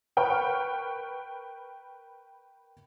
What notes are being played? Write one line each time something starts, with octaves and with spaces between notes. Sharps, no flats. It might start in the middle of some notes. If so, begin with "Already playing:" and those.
A#4 B4 G5 C#6 F6